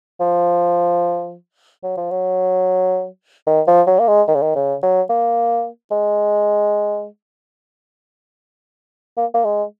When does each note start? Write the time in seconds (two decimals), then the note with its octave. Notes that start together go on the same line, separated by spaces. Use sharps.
0.20 F3
1.83 F#3
1.97 F3
2.11 F#3
3.47 D#3
3.68 F3
3.87 F#3
3.99 A#3
4.08 G#3
4.28 D#3
4.35 C#3
4.42 D#3
4.55 C#3
4.83 F#3
5.10 A#3
5.91 G#3
9.17 A#3
9.34 A#3
9.44 G#3